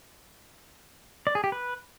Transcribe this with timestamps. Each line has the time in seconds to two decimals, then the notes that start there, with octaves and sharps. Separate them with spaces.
1.27 D5
1.35 G#4
1.44 G4
1.52 B4